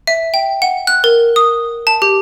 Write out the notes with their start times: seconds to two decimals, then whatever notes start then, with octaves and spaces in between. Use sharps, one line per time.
0.07 E5
0.34 G5
0.62 F#5
0.87 F#6
1.04 A#4
1.36 D#6
1.87 A5
2.02 G4